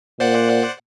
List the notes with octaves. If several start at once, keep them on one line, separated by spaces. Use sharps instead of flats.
A#2 C5 D5 F#5